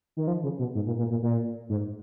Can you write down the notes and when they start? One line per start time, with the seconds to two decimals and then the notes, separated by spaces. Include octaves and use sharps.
0.17 D#3
0.27 F3
0.43 C#3
0.59 B2
0.75 G#2
0.87 A#2
0.98 A#2
1.10 A#2
1.22 A#2
1.69 G#2